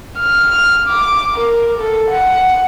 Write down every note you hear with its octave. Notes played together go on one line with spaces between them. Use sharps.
F6
D6
A#4
A4
F#5